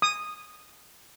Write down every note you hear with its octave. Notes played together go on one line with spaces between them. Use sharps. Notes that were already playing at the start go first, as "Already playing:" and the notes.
D#6